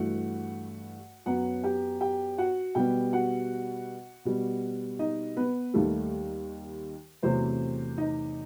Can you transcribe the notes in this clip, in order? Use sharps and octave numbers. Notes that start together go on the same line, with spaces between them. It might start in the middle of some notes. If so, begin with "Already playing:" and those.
Already playing: G2 E3 A3 F#4 F#5
F#2 F#3 B3 F#4 F#5
G4 G5
G4 G5
F#4 F#5
B2 G3 B3 G4 G5
F#4 F#5
B2 G3 B3
D#4 D#5
B3 B4
D#2 D#3 G3 A3 A4
E2 C3 F#3 A3 C4 C5
D#4 D#5